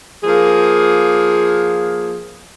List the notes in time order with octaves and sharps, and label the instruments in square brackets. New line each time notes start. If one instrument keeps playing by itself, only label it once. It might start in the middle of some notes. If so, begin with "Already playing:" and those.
[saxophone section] F3 A#3 G#4